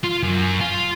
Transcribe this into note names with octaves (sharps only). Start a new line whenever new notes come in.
F4
F#2
F4